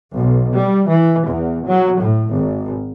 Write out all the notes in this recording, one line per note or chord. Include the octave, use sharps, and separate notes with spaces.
B1
G3
E3
E2
F#3
A2
G#1